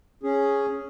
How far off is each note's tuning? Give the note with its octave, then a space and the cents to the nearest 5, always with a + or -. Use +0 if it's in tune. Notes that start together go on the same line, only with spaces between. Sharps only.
C#4 +0 G#4 +0